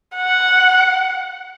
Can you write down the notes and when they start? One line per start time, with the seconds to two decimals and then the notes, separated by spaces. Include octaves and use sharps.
0.16 F#5